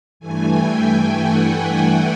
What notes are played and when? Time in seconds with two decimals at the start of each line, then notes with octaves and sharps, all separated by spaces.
0.20 G2 E3 A3 G#5
0.51 G5
1.14 F#5